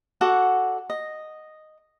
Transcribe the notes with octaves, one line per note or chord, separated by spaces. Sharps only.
F#4 A4 D5 F#5
D#5